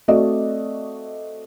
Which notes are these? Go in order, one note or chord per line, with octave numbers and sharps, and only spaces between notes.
A3 C4 F#4 D5 D#5